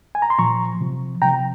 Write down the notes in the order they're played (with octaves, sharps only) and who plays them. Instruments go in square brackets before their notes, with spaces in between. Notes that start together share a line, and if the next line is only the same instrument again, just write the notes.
[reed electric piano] G#5
A#5
C6
A#2 F3 A#5 C#6
C3 F3
C3 F3 G5 A#5